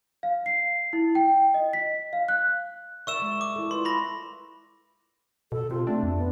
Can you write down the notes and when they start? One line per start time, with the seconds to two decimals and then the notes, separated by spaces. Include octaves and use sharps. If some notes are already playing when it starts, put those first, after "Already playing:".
0.23 F5
0.46 C7
0.93 E4
1.15 G5
1.54 D#5
1.73 B6
2.13 F5
2.29 F#6
3.07 A#4 D5 E5 C#6 E6 E7
3.22 G#3
3.41 D6
3.56 E4 A4
3.71 F4 B4 D5 C6
3.85 B5 A#6
5.52 B2 A4
5.71 C3 F4
5.87 A3 C4 D4
6.03 F2
6.16 B3